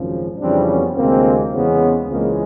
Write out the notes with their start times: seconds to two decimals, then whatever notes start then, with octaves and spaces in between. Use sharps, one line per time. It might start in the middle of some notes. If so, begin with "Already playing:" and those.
Already playing: G#1 F#2 C#3 F3
0.40 F2 C#3 E3 G3 C4 D4
0.68 B3 C#4
0.96 D2 C3 E3 G#3 A#3 C4
1.53 E2 C#3 E3 G#3 B3 C#4
2.09 C#2 C#3 E3 G#3 A#3 C4